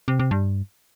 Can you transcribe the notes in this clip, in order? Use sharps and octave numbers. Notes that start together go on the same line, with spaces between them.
C3
C3
G2